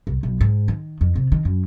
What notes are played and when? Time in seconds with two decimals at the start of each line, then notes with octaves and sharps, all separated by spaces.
0.07 C2
0.23 B1
0.41 G#2
0.68 D#3
1.01 F2
1.16 C3
1.32 D#3
1.45 F#2